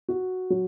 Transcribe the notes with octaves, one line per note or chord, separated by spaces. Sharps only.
F#4
F#3